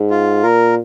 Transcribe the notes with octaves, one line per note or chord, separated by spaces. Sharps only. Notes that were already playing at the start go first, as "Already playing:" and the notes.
Already playing: G#2
F4
A#2 A#4